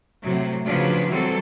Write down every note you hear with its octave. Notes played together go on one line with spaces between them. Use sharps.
A2 C3 F#3
C#3 F3 F#3 D4 F4 B4
E3 F#3 G3 C4 A4